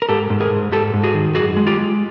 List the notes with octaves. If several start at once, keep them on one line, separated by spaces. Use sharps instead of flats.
A#4
G#2 G4 A4
G#2
G#4 A#4
G#2
G#2 G4 A4
G#2
F#4 G#4
D#3
F#2 F#4 G#4
G#3
F4 G4
G#3